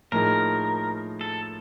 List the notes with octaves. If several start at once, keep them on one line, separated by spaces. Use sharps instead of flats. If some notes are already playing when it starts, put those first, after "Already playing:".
A2 F3 A#3 D#4 G#4 A#4
A4